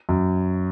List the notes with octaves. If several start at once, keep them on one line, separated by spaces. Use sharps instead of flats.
F#2